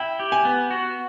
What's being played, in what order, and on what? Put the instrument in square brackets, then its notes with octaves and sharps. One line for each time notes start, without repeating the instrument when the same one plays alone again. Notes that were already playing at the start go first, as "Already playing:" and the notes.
Already playing: [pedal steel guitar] E4 [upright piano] G5
[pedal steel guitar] G4
[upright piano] G#5
[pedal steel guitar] B3
F#4